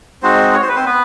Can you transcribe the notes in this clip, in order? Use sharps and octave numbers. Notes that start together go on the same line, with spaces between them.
G#3 C4 D#4 F#4 C5
C#5
C5
B4
C4 C5
B3 B4